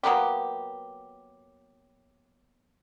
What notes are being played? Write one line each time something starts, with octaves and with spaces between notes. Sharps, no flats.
F#3 A#3 B3 G4